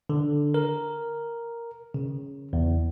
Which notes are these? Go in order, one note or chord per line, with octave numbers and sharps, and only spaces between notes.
D3
A#4
C#3
E2